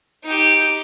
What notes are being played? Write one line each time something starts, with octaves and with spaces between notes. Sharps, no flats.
D#4 G4